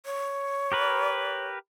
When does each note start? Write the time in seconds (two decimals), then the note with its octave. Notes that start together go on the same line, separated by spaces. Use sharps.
0.06 C#5
0.72 G4 A#4 B4